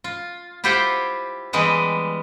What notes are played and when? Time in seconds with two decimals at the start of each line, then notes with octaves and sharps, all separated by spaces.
0.04 F4
0.64 E4 F4 G4 C5 F#5 G5
1.53 E3 G3 G#3 B3